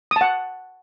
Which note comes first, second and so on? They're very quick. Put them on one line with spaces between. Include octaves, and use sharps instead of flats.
D#6 A5 F#5